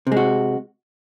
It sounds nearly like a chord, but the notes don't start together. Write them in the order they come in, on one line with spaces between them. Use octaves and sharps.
C3 G#3 F#4